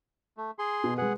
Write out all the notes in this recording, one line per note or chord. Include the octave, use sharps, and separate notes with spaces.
A3
G#4 C6
B2
G#3 G#4 B4 F#5